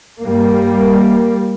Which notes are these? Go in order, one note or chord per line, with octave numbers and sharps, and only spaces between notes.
G2 G3 A#3